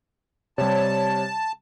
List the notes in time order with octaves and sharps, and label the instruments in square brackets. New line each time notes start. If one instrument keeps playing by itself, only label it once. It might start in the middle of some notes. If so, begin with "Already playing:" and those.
[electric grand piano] C3 G3 [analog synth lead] C#5 [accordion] A5